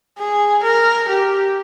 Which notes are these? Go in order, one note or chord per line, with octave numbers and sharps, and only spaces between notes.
G#4
A#4
G4